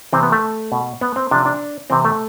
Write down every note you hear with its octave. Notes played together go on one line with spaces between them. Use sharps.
C3 E3 C4
B3
A3
B2
B3
C4
C3 F3 D4
D4
C3 E3 C4
A3